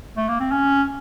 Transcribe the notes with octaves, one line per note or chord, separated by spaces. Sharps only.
A3
A#3
C4
C#4